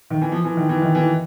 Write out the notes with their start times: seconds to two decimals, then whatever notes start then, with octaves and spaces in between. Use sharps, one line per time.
0.10 D#3
0.21 E3
0.32 F3
0.44 E3
0.57 D#3
0.69 E3
0.82 D#3
0.95 E3